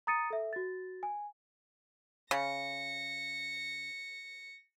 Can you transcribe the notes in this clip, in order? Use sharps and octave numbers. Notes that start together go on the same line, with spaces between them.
A#5 D#6 A6 C#7 D#7
A4 E5
F#4 A6
G#5
C#3 A#6 C#7